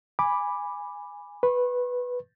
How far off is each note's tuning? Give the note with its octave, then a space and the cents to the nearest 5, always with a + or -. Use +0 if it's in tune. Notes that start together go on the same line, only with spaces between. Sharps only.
G#5 -10 B5 +0 D6 +0
B4 +0 C#6 -40